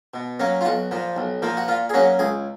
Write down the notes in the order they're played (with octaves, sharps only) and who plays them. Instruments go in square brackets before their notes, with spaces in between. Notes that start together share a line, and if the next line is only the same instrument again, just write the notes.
[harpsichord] B2
F#3 A#3 C#4
F4
B1 F#4
A#2 F3
B1
A#2 F3 A#3
F#4
A#2 F4
G#4
F#3 A#3 C#4 F#4
C#2 G#4